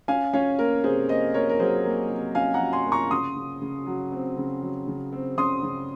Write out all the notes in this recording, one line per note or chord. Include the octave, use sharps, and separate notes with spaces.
C#4 F5 G#5
C#4 C#5 F5
A#3 A#4
C3 G#4 C5
A#3 C5 D#5
A#3 A#4 C#5
A#4
F#3 G#4 C5
A#3
C3
C#4 F5 G#5
F#5 A#5
F#3
G#5 C6
A#3
A#5 C#6
C#3 C6 D#6
C#3
C#3
F#3
C4
C#3
F#3
C#3
C4
C#3 C6 D#6
C#3